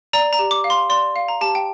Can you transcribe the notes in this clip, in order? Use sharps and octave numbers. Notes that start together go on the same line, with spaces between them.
D5 A#5
A#5
G4
D6
F5
C6
D5 C6
F5
A#5
G4 A5
G5